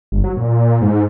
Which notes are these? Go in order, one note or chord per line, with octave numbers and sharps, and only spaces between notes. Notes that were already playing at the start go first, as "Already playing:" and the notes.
G1
F#3
A#2
G#2